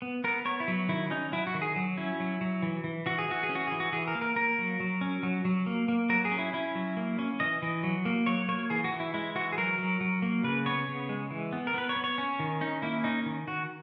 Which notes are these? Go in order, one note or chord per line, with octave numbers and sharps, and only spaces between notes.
B3
B3 A#4
B3 C#5
E4
F#3
D#3 E4
C#4 D#4
F#3 E4
F#4
D#3
G#4
F#3
C#4 E4
F#3
F#3
E3
E3
E3 F#4
G#4
E3 F#4
G#4
C#4
F#4
E3 G#4
F#4
E3 G#4
A#4
A#3
A#4
A#3 A#4
F#3
F#3
C#4
F#3
F#3
A#3
A#3
F#3 A#4
G#4
C#4
E4
C#4 E4
F#3
A#3
C#4
E3 D#5
E3
F#3
A#3
F#3 C#5
A#3 C#5
E3 G#4
F#4
E3
E4
G#3 E4
E3 F#4
G#4
F#3 A#4
F#3
F#3
A#3
C#3 B4
B3 C#5
C#3
G#3
E3
B3
A#4
B3 B4
C#5
B3
C#5
C#4
D#3
C#4 D#4
A#3 E4
C#4 D#4
D#3
D#3 F#4